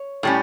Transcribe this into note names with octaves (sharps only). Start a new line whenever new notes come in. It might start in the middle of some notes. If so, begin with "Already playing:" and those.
Already playing: C#5
A2 G3 C#4